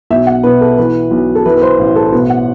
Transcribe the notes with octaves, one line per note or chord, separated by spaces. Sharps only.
B1 E5
F#5
B2 B4
A4
E3 B4
B1
A4
E3 B4
B4
C5
A1
A4
B2 B4
F#5